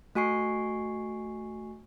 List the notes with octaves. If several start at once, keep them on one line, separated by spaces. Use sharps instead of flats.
A3 F#4 G#5 C#6 C7